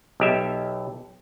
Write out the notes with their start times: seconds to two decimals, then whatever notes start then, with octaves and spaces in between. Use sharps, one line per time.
0.20 B1 G4 E5